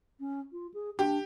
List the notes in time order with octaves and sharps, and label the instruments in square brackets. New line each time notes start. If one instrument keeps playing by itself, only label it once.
[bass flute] C#4
F4
G#4
[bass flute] D4 [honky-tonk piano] G4